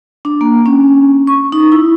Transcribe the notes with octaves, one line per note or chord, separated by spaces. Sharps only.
D4
A#3
C#4
C#6
D#4
E4